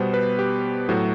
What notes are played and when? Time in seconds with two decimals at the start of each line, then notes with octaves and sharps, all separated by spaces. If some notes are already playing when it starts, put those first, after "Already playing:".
Already playing: B2 G3 B3 C5
0.14 B4
0.39 G4
0.89 A2 F#3 A3 F#4